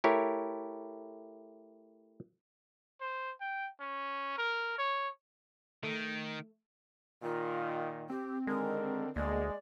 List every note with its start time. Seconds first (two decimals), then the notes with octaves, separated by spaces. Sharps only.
0.04 A3 E4 G4 A#4 C#5
3.01 C5
3.41 G5
3.80 C#4
4.38 A#4
4.78 C#5
5.83 D#3 A3
7.23 A#2 D#3 F4
8.10 C4 G4
8.47 D3 D#3 G#3 A#4
9.16 D2 G#3 A#3 D5